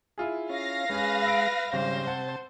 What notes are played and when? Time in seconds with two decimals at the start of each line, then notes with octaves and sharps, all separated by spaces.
0.18 E4 F4 G#4
0.50 C#4 F5 A#6
0.90 G#3 C#4 G#4 B4
1.24 B5 E6 D7
1.73 G#1 C#3 G3 C5
2.07 C3 F#5 A5